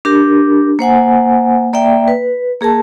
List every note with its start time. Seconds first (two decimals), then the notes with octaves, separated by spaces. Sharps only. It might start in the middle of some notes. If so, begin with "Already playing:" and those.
0.05 D4 G4 A#4
0.79 A#3 C5 F#5 G#5
1.73 A#3 D5 E5 G5
2.08 B4
2.61 A#3 G#4 A#4 A5